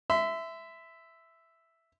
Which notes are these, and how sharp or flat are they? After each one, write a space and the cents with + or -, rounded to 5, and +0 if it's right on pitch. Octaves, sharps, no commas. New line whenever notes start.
E5 +0 C6 -40